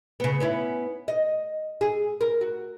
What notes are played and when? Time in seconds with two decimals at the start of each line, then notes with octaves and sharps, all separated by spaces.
0.20 C#3 B3
0.40 B3 C#4 E4
1.08 D#5
1.81 G#4
2.21 A#4
2.41 F#4